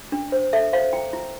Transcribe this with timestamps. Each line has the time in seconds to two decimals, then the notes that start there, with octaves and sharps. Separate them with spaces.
0.12 D4
0.32 C5
0.53 A4 E5
0.73 C5 F5
0.93 E4 G5
1.13 E4